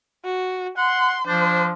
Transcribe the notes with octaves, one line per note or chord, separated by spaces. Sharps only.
F#4
F#5 C6
F3 D4 C5